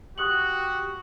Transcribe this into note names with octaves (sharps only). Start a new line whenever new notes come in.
F#4 G4 C#6 D#6 F#6 F#7